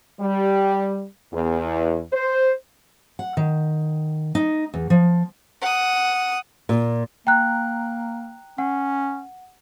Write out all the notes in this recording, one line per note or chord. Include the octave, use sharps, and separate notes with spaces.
G3
E2
C5
F#5
D#3
D#4
E2
F3
F#5 D#6
A#2
A#3 G5 A#5 F#6
C#4 F#5